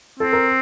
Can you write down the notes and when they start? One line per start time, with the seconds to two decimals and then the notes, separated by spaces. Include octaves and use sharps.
0.20 C4 A4
0.33 A#4